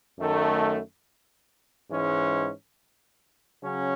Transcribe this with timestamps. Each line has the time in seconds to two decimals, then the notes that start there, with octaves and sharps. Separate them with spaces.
0.18 F#2 D#3 A3
1.90 G#2 E3 G#3 C#4
3.63 C#3 F#3 C#4